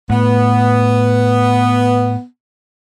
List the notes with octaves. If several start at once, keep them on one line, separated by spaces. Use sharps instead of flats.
A2 B3